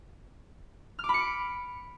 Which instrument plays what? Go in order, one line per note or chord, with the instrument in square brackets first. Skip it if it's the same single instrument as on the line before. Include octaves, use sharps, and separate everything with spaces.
[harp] F6
D6
B5
C#7
D7